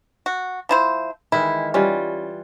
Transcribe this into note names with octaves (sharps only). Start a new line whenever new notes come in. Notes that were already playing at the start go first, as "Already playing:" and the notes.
F#4
F3 E4 C5
D#3 E3 G#3 E4
E3 G3 C#4 F4